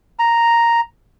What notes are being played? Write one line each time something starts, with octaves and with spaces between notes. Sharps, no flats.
A#5